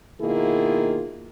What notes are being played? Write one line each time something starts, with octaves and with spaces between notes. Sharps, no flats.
B2 D#3 A#3 E4 F4 G#4